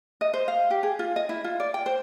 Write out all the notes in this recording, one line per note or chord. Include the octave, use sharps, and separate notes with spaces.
D#5
C5
F5
G4
G#4
F4
D#5
E4
F4
D5
G5
C5